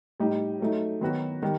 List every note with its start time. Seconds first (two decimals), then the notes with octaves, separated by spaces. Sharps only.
0.20 A2 G3 D#4 G4
0.60 F#3 A3 D#4
1.01 D#3 F#3 B3 F#4
1.43 D#3 G3